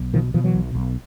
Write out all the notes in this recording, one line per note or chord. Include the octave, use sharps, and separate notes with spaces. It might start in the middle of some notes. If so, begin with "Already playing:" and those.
Already playing: B1
B2 D#3 F3
B2 D#3 F3
E3 F#3
B1
B1